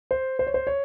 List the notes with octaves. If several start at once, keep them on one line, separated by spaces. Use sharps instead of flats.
C5
C5
C#5
C5
C#5